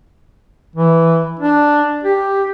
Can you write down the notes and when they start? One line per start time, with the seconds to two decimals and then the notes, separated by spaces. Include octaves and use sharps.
0.76 E3
1.39 D4
2.04 G4